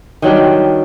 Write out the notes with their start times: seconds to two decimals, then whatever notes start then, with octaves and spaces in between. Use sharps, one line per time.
0.22 D#3 F#3 G3 D4